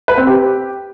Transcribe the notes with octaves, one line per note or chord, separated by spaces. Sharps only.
B4
C4
G4